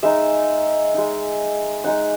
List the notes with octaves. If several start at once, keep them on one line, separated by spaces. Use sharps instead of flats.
G#3 D#4 E5
G#3 D#4
G#3 D#4 F#5